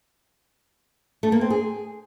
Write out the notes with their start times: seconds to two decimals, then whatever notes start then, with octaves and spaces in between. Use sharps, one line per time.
1.23 A3
1.32 A#3
1.41 C4
1.50 G#4